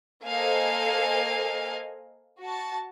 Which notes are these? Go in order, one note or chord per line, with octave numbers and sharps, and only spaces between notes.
A#3 A4 C5 D#5 F5 G#5
F#4 A5